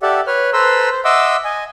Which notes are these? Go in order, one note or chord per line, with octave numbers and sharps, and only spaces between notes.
G4 A4 D5 E5 F#5
B4 C#5 F6
A4 B4 C5 A#5 C6 E6
C5
D#5 E5 F#5 C6 D6 E6
D#5 G#5